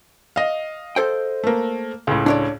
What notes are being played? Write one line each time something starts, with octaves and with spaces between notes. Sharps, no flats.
D#5 F5
A4 C5 G5
A3 A#3
C#2 A2
D4 C#5 D5